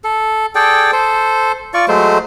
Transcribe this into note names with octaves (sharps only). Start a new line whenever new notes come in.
A4
G#4 A4 D5 G5
A4 C5
F4 D5 C#6
F#3 G#3 A3 C5